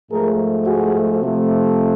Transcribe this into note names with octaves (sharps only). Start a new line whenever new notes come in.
G#2 F3 A3 G#4 A#4
F#4 G#4
C3 F3 A3